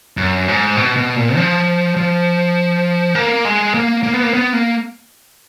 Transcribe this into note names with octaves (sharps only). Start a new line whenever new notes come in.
F#2
G#2
B2
B2
A#2
F3
F3
A#3
G#3
A#3
A#3
B3
A#3
B3
A#3